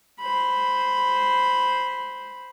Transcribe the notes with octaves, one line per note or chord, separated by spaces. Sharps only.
C5 B5